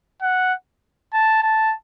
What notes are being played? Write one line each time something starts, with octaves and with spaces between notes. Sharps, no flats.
F#5
A5
A5